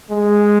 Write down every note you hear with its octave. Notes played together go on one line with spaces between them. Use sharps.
G#3